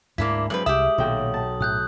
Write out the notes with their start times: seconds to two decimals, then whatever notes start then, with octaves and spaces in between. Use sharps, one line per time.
0.18 D2 G#2 A#3 D4 E4 B6
0.50 G2 F#3 G#3 C4 B4 F#7
0.66 C2 G4 E5 D#6
0.98 B1 A#2 D#3 F#4 G5
1.34 A5
1.61 A2 D#6 F#6 G6